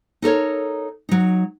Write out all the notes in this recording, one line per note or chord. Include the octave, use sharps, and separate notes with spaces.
D#4 A4 A#4 C#5
F#3 D#4